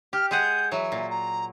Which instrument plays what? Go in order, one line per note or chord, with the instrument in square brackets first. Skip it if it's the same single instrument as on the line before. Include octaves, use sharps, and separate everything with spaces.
[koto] G4 [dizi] F6
[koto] G#3 G#4 F#5 [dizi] G6
[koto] E3 F#3 [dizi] E5
[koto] A#2
[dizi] A#5